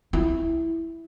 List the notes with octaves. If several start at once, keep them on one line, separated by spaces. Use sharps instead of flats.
E4